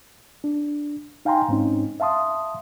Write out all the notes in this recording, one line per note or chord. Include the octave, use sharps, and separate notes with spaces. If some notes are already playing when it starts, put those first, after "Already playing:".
D4
D#4 F5 G5 G#5 A#5 C6
G#2 C4 C#4 D#4
E5 F5 A5 C6 D#6